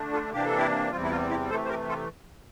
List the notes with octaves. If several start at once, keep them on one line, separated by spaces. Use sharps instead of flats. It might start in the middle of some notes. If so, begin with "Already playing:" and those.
Already playing: D3 A3 D4
F4 A4
C3 E3 A#3 D4 G4
A4
E4 G4
E2 C3 E3 G3 C4 F4
E4
F4
E4 G4
C3 E3 A3 A4 C5
C5
G4 A#4
F4 A4